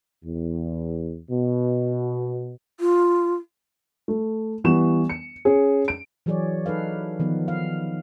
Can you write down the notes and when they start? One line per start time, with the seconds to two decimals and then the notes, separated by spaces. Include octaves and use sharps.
0.25 E2
1.30 B2
2.80 F4
4.08 A3
4.64 E3 G3 B3 C#6 E7
5.10 C#7
5.45 C#4 G#4
5.88 D7
6.26 E3 F#3 G#4 C#5 D5
6.66 D#4 A4 B4 F5
7.20 D#3 F3 B3
7.48 F5